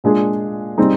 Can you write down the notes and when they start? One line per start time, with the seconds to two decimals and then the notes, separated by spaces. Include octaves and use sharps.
0.04 A#2 G#3 D4 G#4
0.78 G3 C4 D#4 G#4